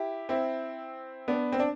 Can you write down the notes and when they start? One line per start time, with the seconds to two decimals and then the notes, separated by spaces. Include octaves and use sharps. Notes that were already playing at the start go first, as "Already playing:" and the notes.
Already playing: E4 G4
0.29 C4 E4
1.28 B3 D4
1.52 C4
1.60 D4